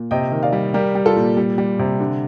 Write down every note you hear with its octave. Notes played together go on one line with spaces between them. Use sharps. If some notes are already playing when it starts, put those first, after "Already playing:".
Already playing: A#2
C3 D#5 G5
D#3
D5 F5
G3
G3 G4 A#4
G3
F4 A4
A#2
G3
G3
C3
D3